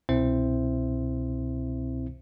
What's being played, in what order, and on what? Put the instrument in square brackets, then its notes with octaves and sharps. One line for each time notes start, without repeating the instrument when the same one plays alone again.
[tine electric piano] C2 B2 C4 E4 C5 E5